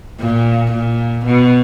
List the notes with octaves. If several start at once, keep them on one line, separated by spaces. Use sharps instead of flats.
A#2
A#2
B2